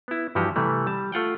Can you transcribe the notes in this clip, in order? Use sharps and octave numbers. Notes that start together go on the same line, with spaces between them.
B3 E4
G2 E3 F3 F#4 G4
C3 E3 G3 A3
G3 A5
A3 F4 F#5 G5